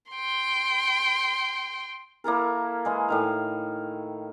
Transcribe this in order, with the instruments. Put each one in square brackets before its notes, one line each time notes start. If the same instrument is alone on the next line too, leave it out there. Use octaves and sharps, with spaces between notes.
[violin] G5 C6
[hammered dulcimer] A#3 E4 A4 A#4
E3 G#3
A2 D#3 F5